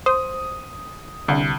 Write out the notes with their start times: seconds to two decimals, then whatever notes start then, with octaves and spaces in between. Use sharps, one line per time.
0.06 C5 D#6
1.28 C2 D3